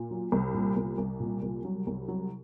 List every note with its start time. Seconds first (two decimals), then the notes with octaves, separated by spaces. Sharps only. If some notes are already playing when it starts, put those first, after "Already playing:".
Already playing: A#2
0.11 F#3
0.32 C2
0.54 A#2
0.77 C2
0.98 C2
1.20 A#2
1.43 C2
1.65 F#3
1.87 C2
2.08 F#3